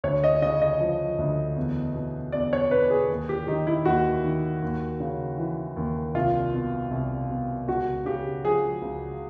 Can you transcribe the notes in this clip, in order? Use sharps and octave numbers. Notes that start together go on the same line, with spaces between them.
D2 C#5
D#5
C#3 D#5
D#5
F3
D2
E2
B2
E2 D5
C#5
B2 B4
G#4
D#2
G4
D#3 D#4
E4
D#2 F#4
D#3
D#2
C#3
E3
D#2
C2 F4
B2
C2
B2
C#2 F#4
C#3 G4
F3 G#4
C#2